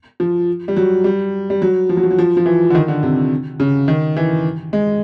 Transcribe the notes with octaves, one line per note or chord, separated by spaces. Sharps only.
F3
G3
F#3
G3
G3
F#3
F3
F#3
F3
F#3
F3
F3
E3
D3
D#3
D3
C3
C#3
D#3
E3
G#3